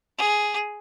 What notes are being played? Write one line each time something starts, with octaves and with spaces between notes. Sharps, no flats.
G#4